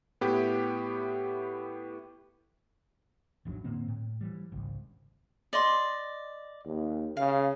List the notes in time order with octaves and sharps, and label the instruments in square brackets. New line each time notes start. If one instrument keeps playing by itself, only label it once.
[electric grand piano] A2 B3 E4 G4
[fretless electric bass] G#1 E2 F#3 D4
A2 D3 A#3 C4
A2
E3 G3
G#1 C#2
[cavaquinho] D5 D#5 C6
[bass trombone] D#2
[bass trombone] C#3 [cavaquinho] F5